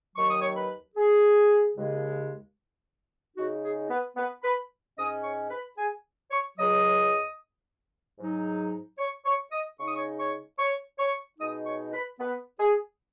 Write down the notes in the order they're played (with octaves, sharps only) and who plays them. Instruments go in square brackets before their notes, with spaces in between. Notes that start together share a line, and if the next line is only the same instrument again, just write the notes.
[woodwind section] D#2 D#3 F#3 C#6
D#6
C#5 C#6
B4 B5
G#4
D#2 C#3 G#3
C#3 G#3 D#4 F#4
G#4
B3 B4
B3 B4
B4 B5
G#2 G#3 C#4 D#5 D#6
C#5 C#6
B4 B5
G#4 G#5
C#5 C#6
C#2 C#3 F#3 D#5 D#6
G#2 F#3 D#4
C#5 C#6
C#5 C#6
D#5 D#6
C#3 G#3 D#4 C#6
D#6
C#5 C#6
C#5 C#6
C#5 C#6
C#5 C#6
B2 G#3 D#4 D#5 D#6
C#5 C#6
B4 B5
B3 B4
G#4